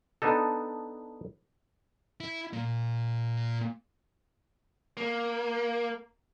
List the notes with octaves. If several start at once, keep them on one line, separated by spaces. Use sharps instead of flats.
B3 D4 D#4 A4
E4
A#2
A#3